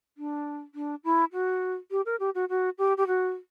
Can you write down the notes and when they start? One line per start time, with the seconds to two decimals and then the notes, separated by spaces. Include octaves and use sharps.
0.18 D4
0.75 D4
1.04 E4
1.33 F#4
1.91 G4
2.06 A#4
2.20 G4
2.35 F#4
2.49 F#4
2.78 G4
2.97 G4
3.07 F#4